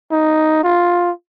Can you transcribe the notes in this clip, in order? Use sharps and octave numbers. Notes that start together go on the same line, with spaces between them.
D#4
F4